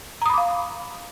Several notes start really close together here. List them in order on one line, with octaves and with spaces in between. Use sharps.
A#5 D#6 B5 D6 F5